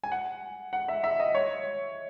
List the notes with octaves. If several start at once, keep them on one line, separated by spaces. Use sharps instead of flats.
G#5
F#5
F#5
E5
E5
D#5
C#5